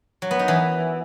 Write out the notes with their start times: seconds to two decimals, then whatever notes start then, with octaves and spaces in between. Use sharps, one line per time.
0.22 F#3
0.31 B3
0.39 D#4
0.48 E3